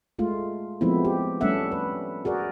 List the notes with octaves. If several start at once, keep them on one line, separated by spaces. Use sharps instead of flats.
G#3 A3 F4
F3 G#3 A3 B3 C4 E4
G4
G3 A3 C#4 D4 E5 F#5
B4
F#4 G#4 A#4 D5